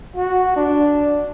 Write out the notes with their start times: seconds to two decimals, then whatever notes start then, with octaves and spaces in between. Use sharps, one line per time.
0.16 F#4
0.56 D4